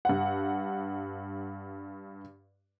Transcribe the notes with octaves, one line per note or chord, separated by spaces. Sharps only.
G2 F#5